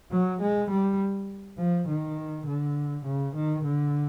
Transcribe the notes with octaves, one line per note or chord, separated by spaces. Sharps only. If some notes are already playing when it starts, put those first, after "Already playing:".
F#3
G#3
G3
F3
D#3
D3
C#3
D#3
D3